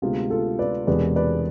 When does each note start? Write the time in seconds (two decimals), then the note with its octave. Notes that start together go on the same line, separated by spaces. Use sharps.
0.02 D2 C3 G#3 B3 F4
0.30 F4 A4
0.59 B4 D5
0.87 E1 E2 C3 G#3 B4 D5
1.16 B4 D5